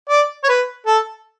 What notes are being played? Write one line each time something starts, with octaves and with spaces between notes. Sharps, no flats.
D5
C#5
B4
A4